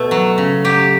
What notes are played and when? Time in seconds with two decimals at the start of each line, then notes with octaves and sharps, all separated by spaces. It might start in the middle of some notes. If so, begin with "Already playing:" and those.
Already playing: B2 A3
0.11 F#3
0.38 C#3
0.64 F#3 G4